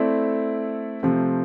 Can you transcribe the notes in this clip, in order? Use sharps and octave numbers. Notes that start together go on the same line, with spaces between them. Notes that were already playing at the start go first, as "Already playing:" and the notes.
Already playing: A3 C4 E4 A4 D5
C3 F3 A3 C4